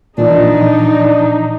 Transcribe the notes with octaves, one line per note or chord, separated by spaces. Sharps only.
A#2 E3 F3 D4 D#4 D5